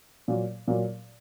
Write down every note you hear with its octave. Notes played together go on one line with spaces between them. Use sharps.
A#2 F#3 A#3
A#2 F#3 A#3